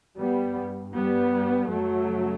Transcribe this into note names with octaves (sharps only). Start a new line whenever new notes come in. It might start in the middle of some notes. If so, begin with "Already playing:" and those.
G2 G3 B3
G3 B3
F#2 C#3 F#3 A3